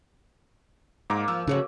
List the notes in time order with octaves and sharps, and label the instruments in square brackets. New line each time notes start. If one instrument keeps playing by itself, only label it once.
[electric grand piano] G#2 A#5 D6 [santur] A#3 A#4
[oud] F3 [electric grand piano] E6
[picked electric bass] C#3 [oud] A3 C#4 F#4